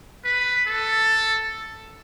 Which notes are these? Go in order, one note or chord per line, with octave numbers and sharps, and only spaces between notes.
B4
A4